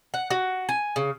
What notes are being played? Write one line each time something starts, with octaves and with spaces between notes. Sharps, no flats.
F#5
F#4
G#5
C#3